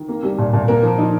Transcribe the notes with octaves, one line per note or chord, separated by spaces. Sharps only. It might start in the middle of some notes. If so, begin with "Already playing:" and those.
Already playing: D#3
A#3
G3
A#2
A#2
A#3 A#4
F3
D#4